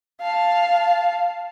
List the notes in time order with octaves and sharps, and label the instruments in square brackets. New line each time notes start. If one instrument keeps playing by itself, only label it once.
[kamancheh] F5 A5